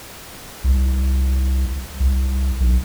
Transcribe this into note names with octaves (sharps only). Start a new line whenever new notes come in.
C2
C2
B1